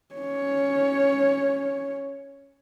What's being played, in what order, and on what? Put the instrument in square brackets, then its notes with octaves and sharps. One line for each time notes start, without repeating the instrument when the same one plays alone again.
[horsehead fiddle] C#4 C#5